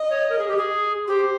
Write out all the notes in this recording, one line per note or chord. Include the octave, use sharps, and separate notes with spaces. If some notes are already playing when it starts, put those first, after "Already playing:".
Already playing: D#5
C#5
A#4
G#4
G4
G#4
G4 C5